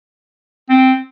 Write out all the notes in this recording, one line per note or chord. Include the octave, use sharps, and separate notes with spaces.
C4